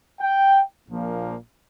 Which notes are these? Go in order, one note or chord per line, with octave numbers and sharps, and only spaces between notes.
G5
A#1 A#2 F3 A#3